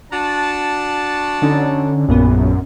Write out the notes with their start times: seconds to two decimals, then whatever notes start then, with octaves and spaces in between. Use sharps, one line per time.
0.12 D4 F#4 A5
1.42 D3 C#4 D#4
2.08 A#1 F#2 A#2 B3